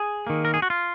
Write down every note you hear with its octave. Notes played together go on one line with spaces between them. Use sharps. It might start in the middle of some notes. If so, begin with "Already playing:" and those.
Already playing: G#4
D#3 A#3
A#4
G#4
F#4
F4